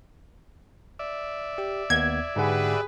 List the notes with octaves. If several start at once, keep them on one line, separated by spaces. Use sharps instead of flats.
D5 E5
G4
D#2 B3 G#6
G#2 D3 G4 G#4 B4 F#5